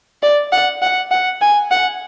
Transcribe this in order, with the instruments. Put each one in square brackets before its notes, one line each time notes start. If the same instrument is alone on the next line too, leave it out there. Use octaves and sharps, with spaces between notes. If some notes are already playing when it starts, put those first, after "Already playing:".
[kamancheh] D5
F#5
F#5
F#5
G#5
F#5